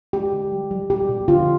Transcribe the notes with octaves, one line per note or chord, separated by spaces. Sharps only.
G#3 G4
D3
G3
G3
B2 G4
B2
D3 F4